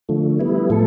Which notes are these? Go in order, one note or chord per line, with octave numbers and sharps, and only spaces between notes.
D3 F3 A3
G3 B3 E4
A2 F3 A3 A4